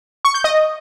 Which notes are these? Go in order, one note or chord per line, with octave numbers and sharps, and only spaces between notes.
C#6
G6
D#5